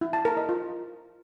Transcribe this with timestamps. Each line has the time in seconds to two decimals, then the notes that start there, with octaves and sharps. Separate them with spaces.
0.01 E4
0.13 A5
0.25 A#4
0.37 D#5
0.49 F4